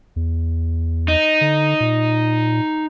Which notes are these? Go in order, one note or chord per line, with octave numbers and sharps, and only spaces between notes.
E2
D#4
D3
A#2